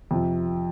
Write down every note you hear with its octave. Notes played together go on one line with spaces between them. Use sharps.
F2 C3 F3